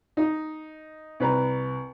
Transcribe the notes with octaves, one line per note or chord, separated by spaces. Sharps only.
D#4
C2 B4 A#5